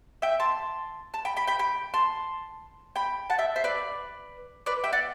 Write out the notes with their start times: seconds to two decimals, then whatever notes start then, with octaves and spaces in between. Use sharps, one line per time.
0.22 E5 G5
0.40 A5 C6
1.14 A5
1.25 G5 B5
1.37 G5 B5
1.47 G5 B5
1.59 G5 B5
1.94 A5 C6
2.96 G5 B5
3.30 F#5 A5
3.38 E5 G5
3.56 C5 E5
3.64 B4 D5
4.66 B4 D5
4.84 E5 G5
4.93 D5 F#5